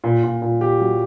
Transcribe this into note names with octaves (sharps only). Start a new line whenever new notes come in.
A#2
A#2
A#2
G4
F#3